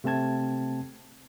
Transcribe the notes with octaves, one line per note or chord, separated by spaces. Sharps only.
C3 A3 C4 A5 G#6